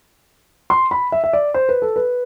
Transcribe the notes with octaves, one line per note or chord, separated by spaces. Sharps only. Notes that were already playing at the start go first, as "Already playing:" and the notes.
C6
B5
E5
E5
D5
C5
B4
A4
B4